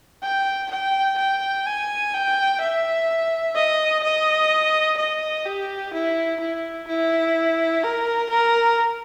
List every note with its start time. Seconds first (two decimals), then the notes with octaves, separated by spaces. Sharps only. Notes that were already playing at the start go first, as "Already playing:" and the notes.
0.23 G5
0.71 G5
1.18 G5
1.66 G#5
2.14 G5
2.61 E5
3.55 D#5
4.03 D#5
4.98 D#5
5.46 G4
5.93 E4
6.40 E4
6.88 E4
7.83 A#4
8.30 A#4